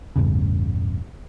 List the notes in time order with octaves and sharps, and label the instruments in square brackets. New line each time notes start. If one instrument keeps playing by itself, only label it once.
[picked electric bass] A1 E2 G2 C#3